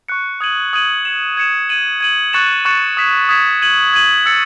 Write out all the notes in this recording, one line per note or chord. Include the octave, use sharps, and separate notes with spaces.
C#6 F#6 C#7
D#6 G#6 D#7 F#7
D#6 G#6 D#7 F#7
G#6 C#7 E7
G#6 C#7 E7
G#6 D#7 F#7
G#6 D#7 F#7
C#6 F#6 A6 C#7 E7
C#6 F#6 A6 C#7 E7
D#6 G#6 B6 E7
D#6 G#6 B6 E7
G#6 D#7 F#7
G#6 D#7 F#7
E6 A6 C#7